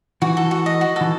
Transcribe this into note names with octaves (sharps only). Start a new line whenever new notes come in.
E3 F#4
A4
F#4
D#5
F#4
A4
E3